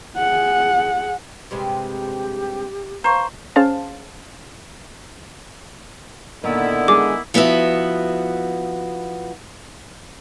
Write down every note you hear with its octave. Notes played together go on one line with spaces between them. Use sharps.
G#4 F#5
G2 C3 G#3 G4
C5 F5 A#5 C#6
C#4 G#4 C5 F5 A5
A#2 D3 D#3 B3 E4
G#3 D4 G#4 D6
F3 B3 E4 F#4 E5